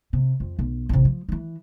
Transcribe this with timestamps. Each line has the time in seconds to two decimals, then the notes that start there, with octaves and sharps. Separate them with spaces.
0.13 C3
0.40 F2
0.59 B1
0.89 A1 C3
1.05 F3
1.29 D#3 E3